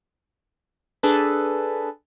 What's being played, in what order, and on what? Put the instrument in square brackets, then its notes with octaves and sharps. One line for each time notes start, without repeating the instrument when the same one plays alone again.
[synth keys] D4 G#4 A4 B4